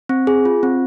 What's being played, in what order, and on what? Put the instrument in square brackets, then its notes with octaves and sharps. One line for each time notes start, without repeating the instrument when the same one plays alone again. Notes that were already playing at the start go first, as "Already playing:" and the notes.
[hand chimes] C4
G#4
F4
C4